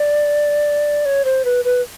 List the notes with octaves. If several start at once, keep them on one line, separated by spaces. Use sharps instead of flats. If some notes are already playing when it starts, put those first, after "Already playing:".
Already playing: D5
C#5
C5
B4
B4